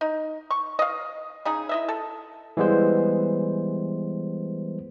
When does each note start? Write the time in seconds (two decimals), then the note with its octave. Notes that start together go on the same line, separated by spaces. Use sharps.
0.01 D#4
0.51 C#6
0.79 D#5 F5
1.45 C#3 D#4 G#4
1.69 E4 D#5 E5
1.88 A4
2.57 E3 G3 G#3 B3 C5